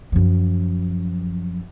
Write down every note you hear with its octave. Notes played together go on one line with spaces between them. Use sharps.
F#2 F3